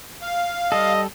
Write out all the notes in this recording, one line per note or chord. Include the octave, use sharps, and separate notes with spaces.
F5
G3 A4 D#5